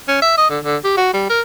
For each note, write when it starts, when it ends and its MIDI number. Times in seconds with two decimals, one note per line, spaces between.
0.08 0.20 61
0.22 0.34 76
0.37 0.49 75
0.50 0.59 50
0.64 0.77 50
0.84 0.93 67
0.97 1.13 66
1.13 1.25 55
1.30 1.41 70